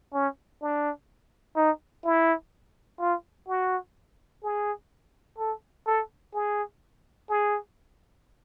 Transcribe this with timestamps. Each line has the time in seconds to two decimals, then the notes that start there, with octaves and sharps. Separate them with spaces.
0.14 C#4
0.62 D4
1.56 D#4
2.05 E4
3.00 F4
3.48 F#4
4.44 G#4
5.38 A4
5.87 A4
6.34 G#4
7.29 G#4